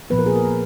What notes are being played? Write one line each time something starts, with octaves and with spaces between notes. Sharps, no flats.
A#2 F3 B3 B4
A#4
G#4
A#4